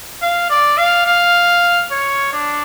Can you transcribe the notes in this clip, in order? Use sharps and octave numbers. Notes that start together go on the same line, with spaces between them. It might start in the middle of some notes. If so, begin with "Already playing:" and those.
F5
D5
F5
F5
C#5
D4